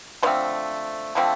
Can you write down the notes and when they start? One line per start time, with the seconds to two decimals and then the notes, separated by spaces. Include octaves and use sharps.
0.23 D3 F3 A3 C4 C5
1.15 D3 F3 A3 C4